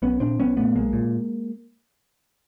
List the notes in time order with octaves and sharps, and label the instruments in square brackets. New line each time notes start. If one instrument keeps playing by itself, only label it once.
[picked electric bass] B1 B3 C#4
A#2 C4 D4
B1 B3 C#4
A#2 A3 B3
B1 G#3 A#3
A#2